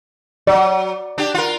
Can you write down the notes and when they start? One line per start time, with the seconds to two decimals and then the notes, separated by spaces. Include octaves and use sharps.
0.47 F#3 D5
1.18 D4 G4
1.34 F4 A#4